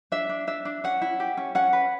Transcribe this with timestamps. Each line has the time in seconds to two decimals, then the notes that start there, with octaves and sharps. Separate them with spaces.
0.12 D4 E5
0.29 D4
0.47 D4 E5
0.65 D4
0.84 C#4 F#5
1.02 E4
1.20 G4
1.37 C#4
1.55 C#4 F#5
1.73 B4